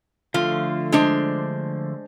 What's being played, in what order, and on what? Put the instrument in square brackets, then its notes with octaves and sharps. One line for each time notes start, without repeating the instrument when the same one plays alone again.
[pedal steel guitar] D3 F3 A3 [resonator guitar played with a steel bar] F4
[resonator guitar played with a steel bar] G#3 D4 C5